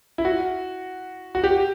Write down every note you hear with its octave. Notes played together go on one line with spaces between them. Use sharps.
E4
F#4
F#4
G4